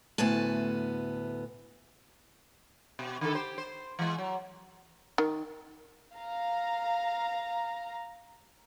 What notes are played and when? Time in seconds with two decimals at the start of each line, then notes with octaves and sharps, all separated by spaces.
0.18 D2 A2 B3 G#5 A5
2.99 B2
3.21 D3 D#3 A4
3.34 G4 C5
3.58 C5
3.99 E3 G#3
4.18 F#3
5.18 D#3
6.17 F5 A#5